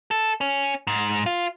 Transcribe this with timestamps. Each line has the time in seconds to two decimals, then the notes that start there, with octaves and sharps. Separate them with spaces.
0.11 A4
0.41 C#4
0.87 G#2
1.26 F4